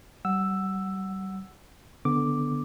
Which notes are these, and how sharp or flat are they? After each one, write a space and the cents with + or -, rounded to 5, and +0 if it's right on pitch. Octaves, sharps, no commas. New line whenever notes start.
G3 -35 F#5 +0 E6 +5
D3 +0 B3 +0 D6 +0